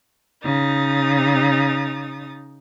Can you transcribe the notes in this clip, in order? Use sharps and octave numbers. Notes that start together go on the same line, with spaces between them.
C#3 D#4 D#6 A6